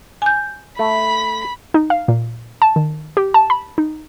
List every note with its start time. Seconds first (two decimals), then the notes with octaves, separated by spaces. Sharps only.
0.22 G#5 G6
0.79 A3 B5 B6
1.74 D#4
1.90 F5
2.08 A#2
2.62 A5
2.76 D#3
3.17 G4
3.34 A5
3.50 B5
3.78 D#4